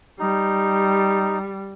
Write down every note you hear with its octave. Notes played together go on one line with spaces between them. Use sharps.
G3 D#4